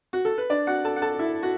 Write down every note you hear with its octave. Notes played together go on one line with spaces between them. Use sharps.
F#4
A4
B4
D4 D5
F#4 F#5
A4 A5
F#5
A4 A5
E4 E5
F#4